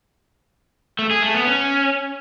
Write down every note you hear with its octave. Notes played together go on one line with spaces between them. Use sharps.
A3
G#4
A3
B3
C#4